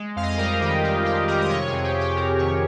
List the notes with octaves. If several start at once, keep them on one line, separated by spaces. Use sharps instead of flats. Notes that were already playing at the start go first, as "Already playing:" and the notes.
Already playing: G#3
F2 F5
D#5
F5
G3 A#4
D#3 G4
D#3 F4
F2 G4
G3 A#4
D#5
C3 C#5
G#4
F2
G4
C3
G4
C3 A#4
D#3 C#5